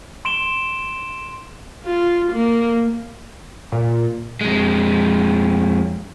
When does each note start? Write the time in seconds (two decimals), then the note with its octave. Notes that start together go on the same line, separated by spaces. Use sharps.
0.25 C6 D7 E7 G7
1.84 F4
2.32 A#3
3.72 A#2
4.41 F2 G#3